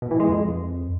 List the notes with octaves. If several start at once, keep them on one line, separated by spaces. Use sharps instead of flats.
B2
E3
G#3
F2